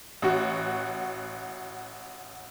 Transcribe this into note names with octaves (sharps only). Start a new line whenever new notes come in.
A1 F#4